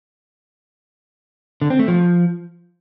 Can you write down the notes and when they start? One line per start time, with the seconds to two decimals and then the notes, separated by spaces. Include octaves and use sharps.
1.62 D3
1.70 C4
1.79 A3
1.88 F3